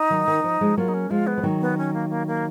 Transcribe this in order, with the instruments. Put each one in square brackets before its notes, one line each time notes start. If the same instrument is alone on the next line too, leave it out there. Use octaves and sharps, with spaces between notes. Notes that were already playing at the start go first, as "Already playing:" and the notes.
Already playing: [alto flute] D#4
[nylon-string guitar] D#3 F#3
D#3
F3
F3 G#3
[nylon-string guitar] F#3 A#3 [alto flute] F4
[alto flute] D#4
C#4
[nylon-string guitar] F3 G#3 [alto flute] F4
[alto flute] B3
[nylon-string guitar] F3
D#3 F#3
[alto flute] B3
C#4
A#3
A#3
A#3